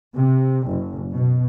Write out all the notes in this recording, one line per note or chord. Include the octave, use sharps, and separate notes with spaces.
C3
F#1
B2